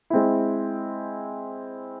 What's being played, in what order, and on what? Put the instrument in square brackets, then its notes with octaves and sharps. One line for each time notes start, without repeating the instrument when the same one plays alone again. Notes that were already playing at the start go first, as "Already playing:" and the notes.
[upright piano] G#3 C4 E4